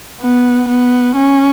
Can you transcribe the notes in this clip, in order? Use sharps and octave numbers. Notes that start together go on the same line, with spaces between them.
B3
B3
C#4